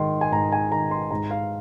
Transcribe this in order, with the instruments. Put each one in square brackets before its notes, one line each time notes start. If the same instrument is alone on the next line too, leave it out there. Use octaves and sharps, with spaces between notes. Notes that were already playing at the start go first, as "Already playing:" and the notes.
Already playing: [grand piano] G#2 D#3 C6
G#5
G#2 A#5
G#5
D#3 A#5
C6
G#2 A#5
F5